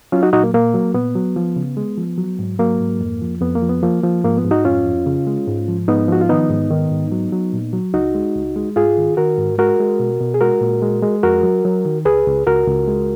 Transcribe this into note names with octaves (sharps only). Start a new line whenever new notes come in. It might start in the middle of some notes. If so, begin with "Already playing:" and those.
F#3 C#4 F4
D#4 F#4
A#2 D#4 F#4
A#3
A#2 A#3
F#3
A#2 B3
F#3
F3
C#3
G#3
F3
F#3
G#2
F#3 A#3
G#2
F2
F3
F2 B3
A#3
F3
B3
F3 A#3
F3
G#2 A#3
B3
G#2
D#4 F#4
F2 C#4 F4
F2
C#3
G#3
G#2
F3
G#2 B3 D#4
F3 F#4
F4
D#3 B3 D#4
G#2
D#3
G#2
F#3
F#3
A#2
F#3
C#2 D#4 F#4
G#3
C#2
G#3
G#2 F4 G#4
D#3
D#3 F#4 A#4
G#2
G#3 F#4 A#4
G#3
B2
B2
G#4
G#3 F#4 A#4
A#2
G#3
G#3
F2 F#4 A#4
F#3
F#3
D#3
C#2 G#4 B4
C#2
C#2 F#4 A#4
C#2
G#3